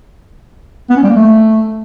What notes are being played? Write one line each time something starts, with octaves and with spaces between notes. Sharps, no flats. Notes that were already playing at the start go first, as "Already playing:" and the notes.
B3
C#4
G3
A#3
A3